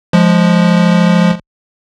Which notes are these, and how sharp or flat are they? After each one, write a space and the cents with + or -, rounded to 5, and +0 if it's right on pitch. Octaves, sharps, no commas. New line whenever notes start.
F3 +0 G#3 +5